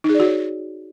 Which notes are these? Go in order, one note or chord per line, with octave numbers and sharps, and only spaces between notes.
D#4
G#4
D5
F#4
C#5